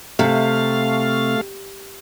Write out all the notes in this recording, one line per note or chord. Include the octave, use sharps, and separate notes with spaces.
C3 A3 F5